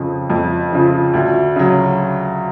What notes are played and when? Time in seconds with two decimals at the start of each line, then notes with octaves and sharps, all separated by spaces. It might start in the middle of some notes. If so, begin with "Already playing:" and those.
Already playing: F2 C#3 F3
0.30 F2
0.72 C#3 F3
1.14 D2
1.56 C#3 F#3